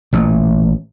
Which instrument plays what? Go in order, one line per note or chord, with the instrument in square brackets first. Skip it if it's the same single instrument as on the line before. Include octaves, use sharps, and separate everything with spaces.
[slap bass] A1 A#2